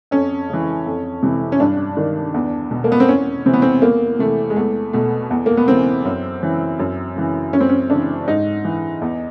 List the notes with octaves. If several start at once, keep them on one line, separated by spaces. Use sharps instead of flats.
F2 C#4
C#3 E3
F2
C3 E3
C#4
G2 D4
D#3
E2
B2
A#3
B3
C4
E2 C#4
C3 E3 C4
B3
C4
E2 A#3
C3 E3 A3
G#3
E2 A3
B2 A3
E2
A#3
B3
C#3 E3 C4
F#2
C#3 E3
F#2
C#3 E3
F#2 C#4
C4
C#4
C#3 D4
E3
G#2 D#4
E3
E2